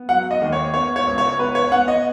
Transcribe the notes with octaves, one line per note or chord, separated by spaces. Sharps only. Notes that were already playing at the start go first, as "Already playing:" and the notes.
Already playing: B3
F#3 F#5
D#5
D#2
C#5
B3 C#5
C#5
C#2
C#5
B3 B4
C#5
B3 F#5
D#5